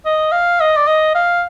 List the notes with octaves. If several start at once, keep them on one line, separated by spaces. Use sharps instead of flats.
D#5
F5
D#5
D5
D#5
F5